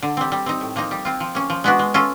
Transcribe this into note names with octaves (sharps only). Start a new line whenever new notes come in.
D3
G3 C4
G3
C4 D#4
A2
F3 A#3 D#4
G3
C4 F4
F3
A#3 C#4
F3
G#3 B3 D4 F#4
G#3
C#4 F4 A4